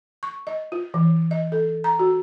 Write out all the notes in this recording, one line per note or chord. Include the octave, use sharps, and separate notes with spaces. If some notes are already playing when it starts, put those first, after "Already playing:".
C#6
D#5
F4
E3
D#5
A4
A#5
F#4